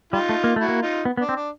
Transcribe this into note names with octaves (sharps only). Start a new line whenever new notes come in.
G3 D#4 F4
A3
A#3
A3 E4 F#4
A#3
D#4 F4
B3
B3
D4
C4
D4